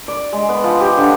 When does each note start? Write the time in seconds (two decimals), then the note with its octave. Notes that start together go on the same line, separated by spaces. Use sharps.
0.08 D5
0.33 G#3
0.49 B3
0.64 F3
0.80 G4
0.97 D3